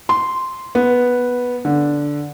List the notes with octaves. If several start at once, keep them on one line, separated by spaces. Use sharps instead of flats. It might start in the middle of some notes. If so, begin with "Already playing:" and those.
C6
B3
D3